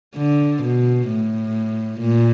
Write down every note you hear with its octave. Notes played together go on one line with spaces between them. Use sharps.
D3
B2
A2
A#2